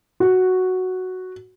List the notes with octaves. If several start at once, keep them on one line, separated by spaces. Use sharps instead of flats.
F#4